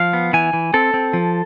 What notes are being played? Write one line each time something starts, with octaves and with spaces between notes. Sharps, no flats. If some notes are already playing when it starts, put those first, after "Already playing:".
Already playing: F3 F5
B3
E3 G#5
E3
C4 A4
C4
F3